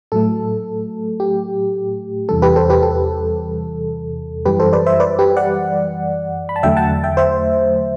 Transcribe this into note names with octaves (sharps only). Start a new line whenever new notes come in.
A2 F#3 A3 A4
G4
E2 C3 E3 G3 A4
G4 B4
A4 C5
G4 B4
A4
F#2 E3 G3 G4 B4
A4 C5
B4 D5
C5 E5
B4 D5
G4 B4
D5 F#5
B5
A5
E2 D3 F#3 A3 E5 G5
F#5 A5
E5 G5
C5 E5